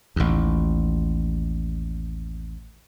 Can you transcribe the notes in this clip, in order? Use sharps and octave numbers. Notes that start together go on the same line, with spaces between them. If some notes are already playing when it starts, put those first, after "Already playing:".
A1 D#2